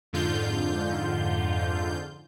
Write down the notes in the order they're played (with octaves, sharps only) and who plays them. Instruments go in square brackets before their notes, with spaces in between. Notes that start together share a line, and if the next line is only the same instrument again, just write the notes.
[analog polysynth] F2 G#2 D3 F4 G6